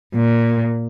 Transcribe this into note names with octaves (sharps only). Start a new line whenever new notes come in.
A#2